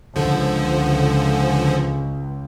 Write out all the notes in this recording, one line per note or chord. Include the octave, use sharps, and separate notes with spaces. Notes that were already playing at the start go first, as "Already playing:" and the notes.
C#2 D3 F3